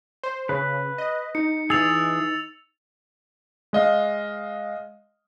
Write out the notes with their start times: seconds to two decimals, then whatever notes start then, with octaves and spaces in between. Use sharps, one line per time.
0.23 C5
0.49 C#3 B4
0.98 D#5
1.35 D#4 C#7
1.70 E3 G#4 E6 A6 F7
3.73 G#3 D#5 F5